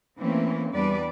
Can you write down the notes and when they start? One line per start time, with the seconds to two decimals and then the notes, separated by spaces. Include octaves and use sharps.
0.19 E3 A3 A#3 C4 C#4
0.73 E2 G3 D4 B4 D5